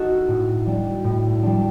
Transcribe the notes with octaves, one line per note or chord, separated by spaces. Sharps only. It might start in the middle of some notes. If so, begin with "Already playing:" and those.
Already playing: D#4 F#4 A4
A2
G3 D4
A2
G3 D4